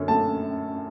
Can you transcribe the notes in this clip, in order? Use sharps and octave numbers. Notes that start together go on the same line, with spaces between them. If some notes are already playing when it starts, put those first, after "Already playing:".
Already playing: F#2 D3 C#4
A3 A5